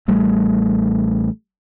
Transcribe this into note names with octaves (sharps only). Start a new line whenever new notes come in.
A1 G3 A3